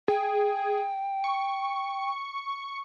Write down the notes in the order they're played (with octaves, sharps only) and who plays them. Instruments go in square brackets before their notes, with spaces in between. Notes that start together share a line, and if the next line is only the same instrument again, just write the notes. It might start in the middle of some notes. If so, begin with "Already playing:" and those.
[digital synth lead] G#4 [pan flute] G5
[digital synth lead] C#6